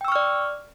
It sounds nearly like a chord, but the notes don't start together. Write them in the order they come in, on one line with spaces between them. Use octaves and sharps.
G5 E6 C#6 F6 D5